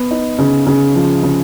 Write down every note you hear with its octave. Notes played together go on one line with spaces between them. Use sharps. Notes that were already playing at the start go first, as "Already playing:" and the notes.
Already playing: B3
D#4
C#3
C#3
F3
C#3